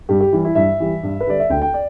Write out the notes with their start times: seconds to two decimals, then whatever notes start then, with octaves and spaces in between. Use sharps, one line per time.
0.09 G2 G4
0.21 G4
0.33 E3 G3
0.44 E4
0.55 G2 E5
0.80 E3 G3
1.03 G2
1.20 B4
1.27 D3 G3 D5
1.40 E5
1.50 D2 G5
1.62 G5
1.74 D5